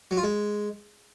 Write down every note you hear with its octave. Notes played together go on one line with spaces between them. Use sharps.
F#3
F4
G#3